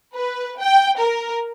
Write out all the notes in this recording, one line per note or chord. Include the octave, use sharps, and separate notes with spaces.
B4
G5
A#4